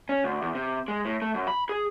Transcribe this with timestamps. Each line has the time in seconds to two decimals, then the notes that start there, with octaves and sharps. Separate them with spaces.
0.09 C#4
0.24 D2
0.42 E2
0.55 C3
0.88 G#3
1.05 A2
1.22 A3
1.34 F#2
1.48 B5
1.69 G#4